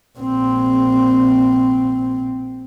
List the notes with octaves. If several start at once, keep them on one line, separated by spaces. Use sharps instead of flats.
A#1 C4